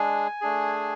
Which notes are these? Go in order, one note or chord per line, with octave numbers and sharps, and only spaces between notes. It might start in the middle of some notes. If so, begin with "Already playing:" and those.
Already playing: G#3 D4 G#4 G#5
A3 D4 G#4